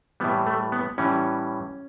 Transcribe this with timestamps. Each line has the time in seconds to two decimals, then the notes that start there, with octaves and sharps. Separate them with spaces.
0.20 A2 E3 G3 B3
0.46 A3
0.72 B3
0.98 A2 E3 G3 C#4